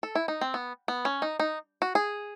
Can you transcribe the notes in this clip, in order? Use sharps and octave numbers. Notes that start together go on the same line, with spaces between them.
A4
E4
D#4
C4
B3
B3
C#4
D#4
D#4
F#4
G#4